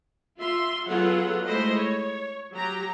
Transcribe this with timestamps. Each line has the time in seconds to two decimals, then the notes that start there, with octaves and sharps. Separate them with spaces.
0.38 F4 E5 C6
0.87 F#3 B3 F4 G#4 A4 F#5
1.46 G#3 A3 E4 C5 D#5
1.78 C#5
2.54 F#3 G4 A#5